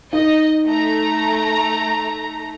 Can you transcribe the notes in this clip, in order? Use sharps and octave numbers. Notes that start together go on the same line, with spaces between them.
D#4 D#5
A3 A#5